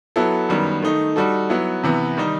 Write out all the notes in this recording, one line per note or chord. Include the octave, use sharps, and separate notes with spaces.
F#3 B3 E4 A4
F#2 D#3 G3 B3
D#3 A3 D#4
G3 D#4 F#4 A4
F#3 B3 E4
C3 E3 B3
D#3 G3 D#4